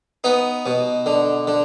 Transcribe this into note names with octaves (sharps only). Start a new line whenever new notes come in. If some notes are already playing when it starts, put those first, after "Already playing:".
B3 D#4
B2
D3
D3